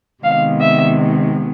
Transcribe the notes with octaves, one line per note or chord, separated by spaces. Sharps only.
C3 D#3 G#3 B3 F5
E5